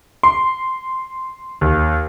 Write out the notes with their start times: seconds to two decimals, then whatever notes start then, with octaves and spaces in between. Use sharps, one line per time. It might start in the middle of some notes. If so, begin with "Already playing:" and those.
0.23 C6
1.61 D#2